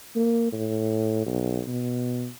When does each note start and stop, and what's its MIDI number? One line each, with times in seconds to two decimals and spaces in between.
0.16 0.52 58
0.52 1.26 45
1.26 1.62 35
1.68 2.27 47